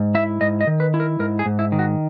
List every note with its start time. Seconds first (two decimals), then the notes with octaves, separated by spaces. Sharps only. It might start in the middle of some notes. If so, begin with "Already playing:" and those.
Already playing: G#2
0.15 E4 E5
0.41 G#2 D#5
0.61 D#5
0.67 D#3
0.80 B4
0.94 E4
1.00 A#4
1.19 G#2 A#4
1.39 G#4
1.46 G#2
1.59 E4
1.72 D#3
1.79 F#4